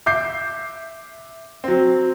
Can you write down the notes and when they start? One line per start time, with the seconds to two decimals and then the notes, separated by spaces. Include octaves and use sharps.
0.06 E5 D6 G6 C7
1.64 F#3 C4